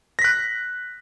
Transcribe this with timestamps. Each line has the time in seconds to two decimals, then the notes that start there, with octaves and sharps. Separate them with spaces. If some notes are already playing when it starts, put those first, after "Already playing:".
0.19 A#6
0.22 B6
0.24 F#6